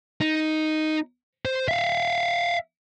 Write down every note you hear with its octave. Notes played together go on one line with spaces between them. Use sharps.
D#4
C5
E5 F5